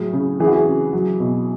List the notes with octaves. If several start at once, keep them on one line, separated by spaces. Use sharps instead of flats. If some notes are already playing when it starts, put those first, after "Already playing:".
Already playing: A2 F#3 G#4
C#3
E3 G#4
F#4
G#4
C#3
F#3
B2